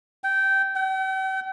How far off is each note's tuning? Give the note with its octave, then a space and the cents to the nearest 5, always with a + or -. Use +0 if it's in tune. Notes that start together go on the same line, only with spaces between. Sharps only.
G5 -15
G5 -45